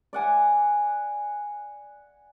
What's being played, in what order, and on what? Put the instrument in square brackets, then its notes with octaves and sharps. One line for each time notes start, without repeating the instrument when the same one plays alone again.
[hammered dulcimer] D5 F#5 G#5